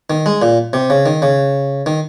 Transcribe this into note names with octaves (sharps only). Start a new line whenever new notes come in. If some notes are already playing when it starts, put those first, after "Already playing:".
D#3
G#3
A#2
C3
C#3
D#3
C#3
D#3